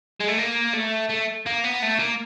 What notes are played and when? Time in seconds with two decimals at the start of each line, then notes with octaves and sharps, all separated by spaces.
0.21 G#3
0.29 A3
0.38 A#3
0.74 A3
1.09 A3
1.46 A#3
1.64 B3
1.82 A3
1.99 A#3